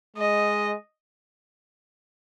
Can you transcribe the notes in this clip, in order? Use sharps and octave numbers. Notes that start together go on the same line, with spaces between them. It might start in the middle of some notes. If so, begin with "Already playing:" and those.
G#3 D#5